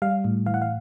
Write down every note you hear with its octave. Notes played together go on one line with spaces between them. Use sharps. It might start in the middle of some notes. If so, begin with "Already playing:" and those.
G3 F5
A2
E3 F5
F#5
F5